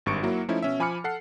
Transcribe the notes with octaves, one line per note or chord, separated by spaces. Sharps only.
G#1 G2 C#6 C#7 D7
F#3 A#3 E4 F#4
F3 A3 C#4 D#4 E4
B2 C#4 E5
F3 G#5 B5 D6 F6 C#7
A4 F#5 C7